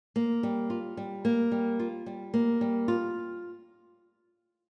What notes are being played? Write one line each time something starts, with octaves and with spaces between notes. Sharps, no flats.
A#3
G3
F4
G3
A#3
G3
F4
G3
A#3
G3
F4